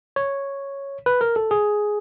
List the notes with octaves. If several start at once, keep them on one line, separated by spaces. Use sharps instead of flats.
C#5
B4
A#4
A4
G#4